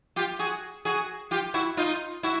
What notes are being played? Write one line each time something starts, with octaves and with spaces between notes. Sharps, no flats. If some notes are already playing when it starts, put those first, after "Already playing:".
F4 G4
F#4 G#4
F#4 G#4
F4 G4
E4 F#4
D#4 F4
E4 F#4